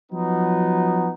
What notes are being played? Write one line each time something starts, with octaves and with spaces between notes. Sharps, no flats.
F3 F#3 B3 D#4